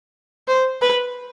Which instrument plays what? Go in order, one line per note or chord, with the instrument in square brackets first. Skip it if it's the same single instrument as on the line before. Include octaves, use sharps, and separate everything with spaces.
[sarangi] C5
B4